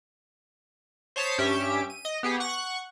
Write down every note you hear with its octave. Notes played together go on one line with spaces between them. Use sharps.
C5 C#5 A5 D#6 G6 B6
G2 C#4 G4 E5 D7
D#7
D#5
B3 G4 G#4
F#5 C#6 F#6